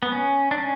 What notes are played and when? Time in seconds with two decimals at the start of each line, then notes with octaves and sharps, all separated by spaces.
0.03 B3
0.12 C#4
0.51 D4
0.58 C#4